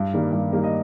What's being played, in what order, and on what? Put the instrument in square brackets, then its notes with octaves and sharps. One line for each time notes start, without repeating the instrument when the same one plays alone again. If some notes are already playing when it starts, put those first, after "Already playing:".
Already playing: [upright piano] G2
D#3 G3 A#3
G2
D#3 G3 A#3
D#5